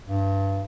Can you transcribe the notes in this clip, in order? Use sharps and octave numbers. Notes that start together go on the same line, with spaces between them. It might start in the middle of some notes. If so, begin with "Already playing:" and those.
G2